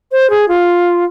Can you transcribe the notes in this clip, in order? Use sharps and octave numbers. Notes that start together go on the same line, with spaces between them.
C5
G#4
F4